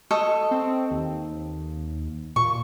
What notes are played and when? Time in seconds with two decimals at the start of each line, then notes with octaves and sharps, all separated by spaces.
0.11 A4 D#5 C#6
0.51 C4
0.91 D#2
2.36 A#2 C#6